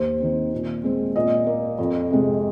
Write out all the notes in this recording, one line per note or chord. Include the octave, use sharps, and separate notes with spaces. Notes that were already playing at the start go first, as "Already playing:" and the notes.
Already playing: D#2 C5
D#3 C4
A#2
G#3 C4
A#2 D#5
A#3
F2
C3 G#3